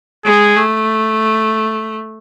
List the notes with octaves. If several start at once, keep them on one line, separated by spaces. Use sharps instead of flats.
G#3 G#4
A3